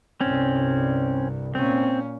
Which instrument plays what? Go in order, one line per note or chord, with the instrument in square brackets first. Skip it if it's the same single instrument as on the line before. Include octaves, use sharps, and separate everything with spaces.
[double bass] C2 G2 [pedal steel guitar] C4 C#4
[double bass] A#2 C#4 [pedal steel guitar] C4